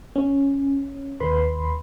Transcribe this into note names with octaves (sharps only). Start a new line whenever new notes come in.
C#4
D#2 B4 B5 C6